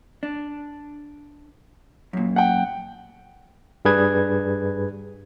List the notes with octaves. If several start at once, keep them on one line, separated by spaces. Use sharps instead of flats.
D4
F#2 A#2
F#5 G5
G2 G3 G#4 B4 G#6